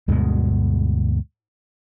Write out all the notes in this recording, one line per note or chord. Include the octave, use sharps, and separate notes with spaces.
D2 G2 B2 G#3